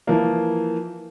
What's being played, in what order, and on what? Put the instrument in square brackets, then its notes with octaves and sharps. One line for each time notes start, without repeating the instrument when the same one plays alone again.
[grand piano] E3 F3 A#3